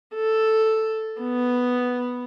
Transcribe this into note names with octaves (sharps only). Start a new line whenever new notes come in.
A4
B3